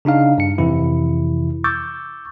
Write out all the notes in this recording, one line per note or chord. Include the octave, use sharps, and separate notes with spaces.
C#3 D4 D#4 F5
G2 C#7
F2 C3 E3 E4
C#6 D6 E6 G6 A6